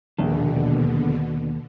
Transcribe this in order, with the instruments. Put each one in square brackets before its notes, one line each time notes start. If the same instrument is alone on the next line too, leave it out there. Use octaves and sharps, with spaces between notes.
[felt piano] E1 A#1 [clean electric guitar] D#2 [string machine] B2 D3